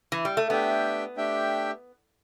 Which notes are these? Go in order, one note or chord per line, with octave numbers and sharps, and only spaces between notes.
E3
G3
A3
A3 B3 D4 G4 E5 G5
A3 D4 G4 E5 G5